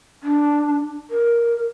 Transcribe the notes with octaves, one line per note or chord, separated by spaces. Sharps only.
D4
A#4